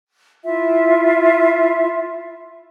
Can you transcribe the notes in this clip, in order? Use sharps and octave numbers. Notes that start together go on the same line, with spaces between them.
E4 F4 E5